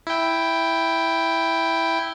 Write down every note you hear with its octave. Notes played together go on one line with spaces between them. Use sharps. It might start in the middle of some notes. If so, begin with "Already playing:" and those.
E4 G5